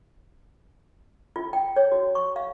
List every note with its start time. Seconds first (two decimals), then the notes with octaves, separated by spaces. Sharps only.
1.36 F4
1.53 G5
1.76 C#5
1.92 F#4
2.15 C#6
2.36 F5